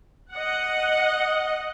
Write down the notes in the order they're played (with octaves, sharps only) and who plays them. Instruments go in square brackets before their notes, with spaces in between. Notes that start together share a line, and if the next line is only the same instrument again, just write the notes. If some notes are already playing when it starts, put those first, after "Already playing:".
[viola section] D#5 F#5